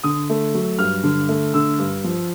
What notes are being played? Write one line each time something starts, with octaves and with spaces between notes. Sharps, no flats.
D3 D#6
A3
F#3
G2 F6
D3
A3
D3 E6
G2
F3